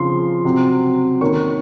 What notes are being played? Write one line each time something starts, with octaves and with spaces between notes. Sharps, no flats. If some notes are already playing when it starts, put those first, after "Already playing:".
Already playing: C#3 F3 C4 C6
C3 F#3 C4
D#3 A#3 C#4 C#6